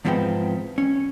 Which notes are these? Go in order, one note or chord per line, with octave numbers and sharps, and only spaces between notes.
E2 G#2 F3 B3 C4 G5
C#4